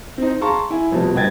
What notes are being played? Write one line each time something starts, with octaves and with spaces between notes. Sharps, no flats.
C4 D#4
G#4 F5 A5 A#5 C6 C#6
E4 G#5
F1 F2 B2 G3
F#1 G2 D#5 G5 G#6 A6